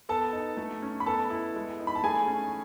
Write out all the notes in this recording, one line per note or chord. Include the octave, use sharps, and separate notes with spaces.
B3 A4 A5
D#4
A3
C#4
B5
B3 A4 A5
E4
G#3
D#4
B5
A5
A3 G#4 G#5
C#4